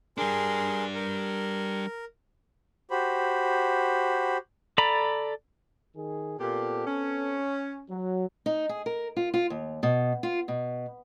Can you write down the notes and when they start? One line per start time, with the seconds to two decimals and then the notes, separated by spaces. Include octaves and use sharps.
0.18 G3 D4 G#4 A#4 C6
0.95 A#4
2.91 F#4 G4 C5 B5
4.78 A4 D5 A#5 B5
5.96 D#3 G#4
6.40 A#2 B3 C4 G4 A4
6.87 C#4
7.89 F#3
8.46 D#4
8.69 G#4
8.86 A#4
9.16 F4
9.34 F4
9.50 D#2
9.83 B2
10.23 F4
10.48 B2